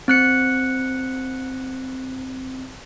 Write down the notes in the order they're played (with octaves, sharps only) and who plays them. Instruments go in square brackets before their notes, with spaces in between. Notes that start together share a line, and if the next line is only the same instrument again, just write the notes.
[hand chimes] C4 F#6 C#7